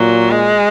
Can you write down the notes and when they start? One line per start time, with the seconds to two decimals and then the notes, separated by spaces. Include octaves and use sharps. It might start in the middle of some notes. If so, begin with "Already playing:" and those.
Already playing: A#2 F#3
0.31 G#3